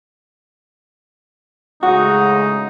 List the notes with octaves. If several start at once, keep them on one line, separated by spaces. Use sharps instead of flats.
A2 C#3 G#3 D#4 F#4